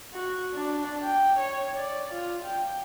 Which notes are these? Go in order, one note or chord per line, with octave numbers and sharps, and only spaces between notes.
F#4
D4
G5
C#5
D5
F4
G5